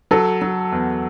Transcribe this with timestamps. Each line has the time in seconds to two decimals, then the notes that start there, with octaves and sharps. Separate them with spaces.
0.11 F#3 A4
0.42 F#3
0.72 E2